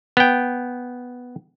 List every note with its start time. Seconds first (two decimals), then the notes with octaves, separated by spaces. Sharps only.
0.17 B3 G5